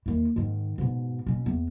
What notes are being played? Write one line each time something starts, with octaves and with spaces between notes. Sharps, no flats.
D#2 E3
G#2 D#3
G#2 B2
B2 C#4
E2